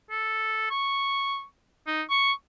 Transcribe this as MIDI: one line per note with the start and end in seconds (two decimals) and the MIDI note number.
0.11 0.70 69
0.71 1.44 85
1.87 2.03 63
2.10 2.32 85